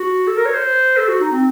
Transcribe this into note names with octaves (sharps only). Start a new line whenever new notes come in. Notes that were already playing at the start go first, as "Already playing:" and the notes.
Already playing: F#4
A4
A#4
C#5
C5
A4
F#4
D#4
C4